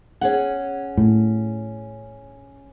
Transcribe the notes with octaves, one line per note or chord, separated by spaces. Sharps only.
C#4 G#4 F#5
A2